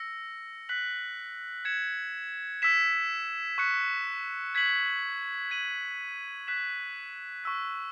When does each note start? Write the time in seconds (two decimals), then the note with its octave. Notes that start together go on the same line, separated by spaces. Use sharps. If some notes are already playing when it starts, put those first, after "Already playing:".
Already playing: E6 A#6 C#7
0.69 F#6 B6 F#7
1.65 G#6 C#7 E7
2.62 E6 B6 E7
3.58 C#6 F#6 C#7
4.55 G#6 B6 F#7
5.51 G#6 D#7 F#7
6.47 F#6 B6 E7
7.44 C#6 E6 B6